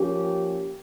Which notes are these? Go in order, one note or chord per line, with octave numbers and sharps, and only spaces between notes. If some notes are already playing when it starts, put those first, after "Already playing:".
Already playing: F3 A#3 C#4 G4